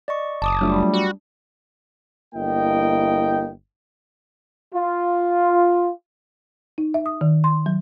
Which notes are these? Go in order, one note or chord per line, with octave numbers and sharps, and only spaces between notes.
D5 D#5 C#6
F#1 A5 D6 D#6
F#3 G3 A3 D4 F4
F#4
G1 A#3 E4 D#5 G5
F4
D#4
E5
D#6
D#3
C6
F#3